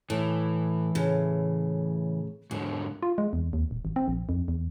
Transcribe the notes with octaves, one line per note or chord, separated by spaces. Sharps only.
A2 E3
A2 C#3
D#2 G#2 B2 D3
F4
G#3
E2
D#2
D#1
G#1
C4
A#1
F2
E2